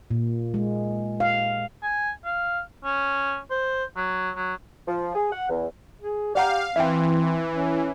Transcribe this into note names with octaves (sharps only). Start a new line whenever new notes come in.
A#2
G#3
F5
G#5
F5
C#4
C5
F#3
F#3
F3
G#4
F#5
E2
G#4
G4 D5 F5 F#5 A#5
E3 C4 E5 G5
C#4